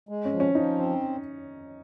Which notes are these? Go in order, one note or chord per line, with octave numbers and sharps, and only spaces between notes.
G#3
C#4
F3
C#4
F3 D#4
C4